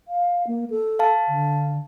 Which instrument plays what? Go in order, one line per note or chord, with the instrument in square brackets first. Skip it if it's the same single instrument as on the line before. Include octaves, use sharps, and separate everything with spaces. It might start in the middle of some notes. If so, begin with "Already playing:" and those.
[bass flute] F5
A#3
A4
[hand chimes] F5 A5
[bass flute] D3